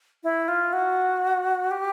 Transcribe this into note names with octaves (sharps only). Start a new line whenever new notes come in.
E4
F4
F#4
G4